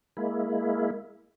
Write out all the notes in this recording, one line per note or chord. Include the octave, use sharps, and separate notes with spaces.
G#3 A#3 E4